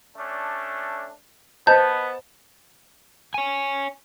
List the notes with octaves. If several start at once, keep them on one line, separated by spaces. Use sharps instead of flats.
A3 C#4 D4
B3 C5 D#5 A5 G6
C#5 G#5